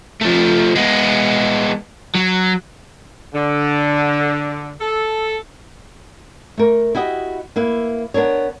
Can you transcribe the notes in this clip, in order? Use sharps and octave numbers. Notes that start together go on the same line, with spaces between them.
F3 A3
G#3 B3
F#3
D3
A4
A3 A#4
E4 F#4 G4 D#5
A#3 E4 B4 E5
B3 D4 A#4 C#5